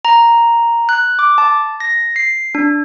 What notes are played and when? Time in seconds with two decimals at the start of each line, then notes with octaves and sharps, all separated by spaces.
0.05 A#5
0.89 F#6
1.19 D6
1.38 A5
1.80 A#6
2.16 C7
2.55 D4